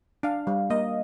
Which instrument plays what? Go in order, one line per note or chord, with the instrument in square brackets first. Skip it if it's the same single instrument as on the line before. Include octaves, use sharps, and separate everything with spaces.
[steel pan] D4 [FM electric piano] F5
[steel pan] G3
[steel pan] A#3 [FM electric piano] D#5